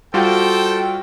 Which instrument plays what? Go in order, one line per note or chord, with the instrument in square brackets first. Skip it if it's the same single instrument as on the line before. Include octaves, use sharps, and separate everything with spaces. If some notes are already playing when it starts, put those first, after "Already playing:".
[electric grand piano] G3 F4 F#4 [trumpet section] A4 C5 G5